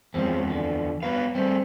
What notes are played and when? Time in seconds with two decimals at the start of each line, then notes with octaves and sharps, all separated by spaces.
0.14 E2 F3 G#3 C4 C#4
0.50 D3
1.03 F#3 B3 B4 F5
1.35 G3 A3 C4